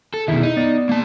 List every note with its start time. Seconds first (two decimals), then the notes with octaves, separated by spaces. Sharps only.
0.14 A4
0.28 B2 D#3 E4 G#4 E5
0.43 D#4
0.56 B3 D5
0.89 A#3 A5